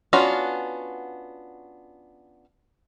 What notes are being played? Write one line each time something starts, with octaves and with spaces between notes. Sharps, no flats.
B3 C#4 D4 F4 F#4